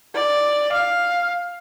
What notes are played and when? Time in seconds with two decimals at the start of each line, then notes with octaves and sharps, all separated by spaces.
0.16 D5
0.72 F5